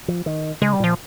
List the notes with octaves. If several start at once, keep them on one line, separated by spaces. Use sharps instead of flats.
F3
D#3
C#3 G#3
G3
A#2 F3